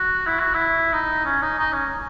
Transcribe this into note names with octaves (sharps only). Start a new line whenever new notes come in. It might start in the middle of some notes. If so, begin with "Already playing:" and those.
Already playing: F#4
E4
F#4
E4
D#4
C#4
D#4
D#4
C#4